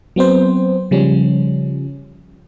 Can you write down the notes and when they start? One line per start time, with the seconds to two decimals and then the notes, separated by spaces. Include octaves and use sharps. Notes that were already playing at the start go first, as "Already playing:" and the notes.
0.16 F#3 B3 C4 C5
0.91 C#3 F3 G3 C#4